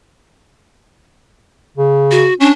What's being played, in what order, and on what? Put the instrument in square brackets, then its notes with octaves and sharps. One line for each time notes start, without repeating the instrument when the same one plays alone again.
[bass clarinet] C#3
[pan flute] F#4
[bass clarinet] C#4 [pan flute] D4